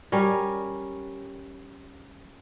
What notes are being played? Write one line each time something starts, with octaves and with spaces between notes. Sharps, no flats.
G3 C#4 A#4